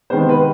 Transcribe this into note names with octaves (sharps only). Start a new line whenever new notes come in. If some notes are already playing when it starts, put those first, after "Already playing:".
C3 D#3 G#3 B3 C5
B4